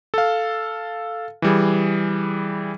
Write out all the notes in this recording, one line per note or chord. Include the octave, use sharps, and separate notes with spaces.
A4 F5
E3 G3 G#4